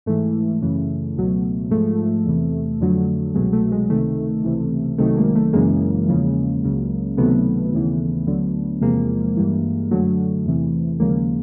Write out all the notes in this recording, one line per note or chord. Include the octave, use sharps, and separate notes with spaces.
G#2 E3 A3
F#2 C#3 E3
C#2 B2 F#3
G#2 F3 A3
E2 C3 E3
F2 D3 F#3
C2 B2 F#3 G#3
A3
G#3
C#2 C3 D#3 A3
C#2 C3 E3
C2 C3 D#3 F#3 A3
G#3 A#3
A3
F#2 C#3 E3 G#3 A#3
E2 C#3 F3
C#2 C#3 F#3
C#2 C3 D#3 F#3 A3 B3
D#2 C#3 E3
D2 D3 F#3
E2 C3 F3 G#3 A#3
G2 E3
F#2 D3 F#3 A3
E2 C3 E3
D#2 C#3 F3 G#3 A#3